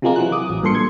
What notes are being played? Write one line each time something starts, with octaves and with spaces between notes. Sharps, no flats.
C3 F3 G#3 A#3
E3 F#3 F#6
D6 D#6
A1
G2 A#2 A4 C6 C#7
G#6